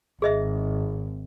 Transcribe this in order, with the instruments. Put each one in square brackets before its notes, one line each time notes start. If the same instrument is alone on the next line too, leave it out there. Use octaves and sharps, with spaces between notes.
[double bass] G#1 [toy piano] G#4 D#5 E5